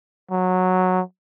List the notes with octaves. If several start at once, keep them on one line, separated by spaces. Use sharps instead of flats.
F#3